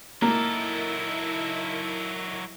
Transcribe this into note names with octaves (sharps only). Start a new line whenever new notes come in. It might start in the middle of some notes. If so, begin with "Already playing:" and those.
F#3 A#3 D#4 E4 A4 A#4